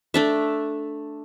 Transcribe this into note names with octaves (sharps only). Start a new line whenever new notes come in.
A3 D4 E5